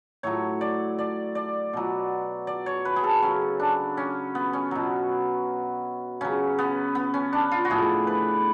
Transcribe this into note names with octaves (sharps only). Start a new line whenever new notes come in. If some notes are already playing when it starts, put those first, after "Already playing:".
A2 F#3 C#5
D5
D5
D5
B2 F#3
D5
C#5
B4
G#4
A4
C#3 F#3 C#4
D4
C#4
B3
C#4
B2 F#3
C#3 F#3 C#4
B3
B3
C#4
D4
F4
F#4
A2 F3 G#4
B4